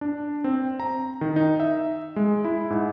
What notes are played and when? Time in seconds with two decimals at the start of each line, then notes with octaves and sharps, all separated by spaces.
0.01 D4
0.44 C4
0.80 A#5
1.21 D#3
1.36 D#4
1.60 E5
2.16 G#3
2.44 E4
2.70 G#2